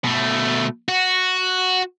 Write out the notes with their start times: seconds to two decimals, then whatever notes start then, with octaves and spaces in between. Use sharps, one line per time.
0.04 B2 A3
0.88 F#4